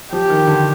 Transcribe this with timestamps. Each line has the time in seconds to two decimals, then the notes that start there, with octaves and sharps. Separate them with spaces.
0.12 F3 G4
0.30 D#3
0.48 D3